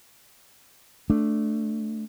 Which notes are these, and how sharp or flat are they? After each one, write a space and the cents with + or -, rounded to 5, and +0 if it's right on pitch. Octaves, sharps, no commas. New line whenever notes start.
A3 +0 D4 +0